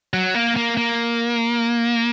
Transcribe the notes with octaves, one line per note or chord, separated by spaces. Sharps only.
F#3
A#3
A#3
A#3